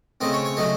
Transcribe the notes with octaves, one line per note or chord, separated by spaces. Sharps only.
C#3 A3 C4 D#5
C#5
C#5
C#3 F#3 A3 D#5